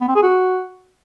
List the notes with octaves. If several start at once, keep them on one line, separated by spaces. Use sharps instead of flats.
B3
C4
G#4
F#4